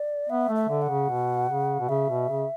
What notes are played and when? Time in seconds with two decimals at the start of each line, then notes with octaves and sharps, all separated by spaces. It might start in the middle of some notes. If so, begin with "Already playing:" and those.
Already playing: D5
0.29 B3 E5
0.49 A3
0.55 E5
0.69 D3
0.82 F#5
0.89 C#3
1.10 B2
1.49 C#3
1.80 B2
1.89 C#3 E5
2.09 B2
2.29 C#3